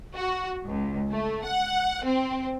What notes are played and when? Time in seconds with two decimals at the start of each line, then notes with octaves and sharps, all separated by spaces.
0.15 F#4
0.68 C#2
1.11 A3
1.44 F#5
2.04 C4